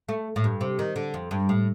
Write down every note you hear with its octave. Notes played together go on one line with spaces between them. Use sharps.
A3
A2
G2
C3
D#3
D3
F2
G2
A2